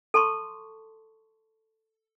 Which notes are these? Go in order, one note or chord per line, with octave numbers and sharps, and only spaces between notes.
A4 A5 C6 C#6